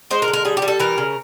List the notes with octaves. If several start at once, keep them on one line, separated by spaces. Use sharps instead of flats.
G#3 C5
A#4
D3
A#4
G3 G#4
G4
G3
A4
E3 A#4
C#3